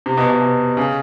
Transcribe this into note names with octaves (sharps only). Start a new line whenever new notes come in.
C3
B2
B2
B2
C#3